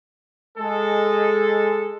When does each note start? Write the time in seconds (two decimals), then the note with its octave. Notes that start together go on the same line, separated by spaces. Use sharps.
0.58 G#3 A4